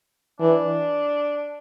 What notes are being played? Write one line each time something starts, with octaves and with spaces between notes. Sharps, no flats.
E3 D4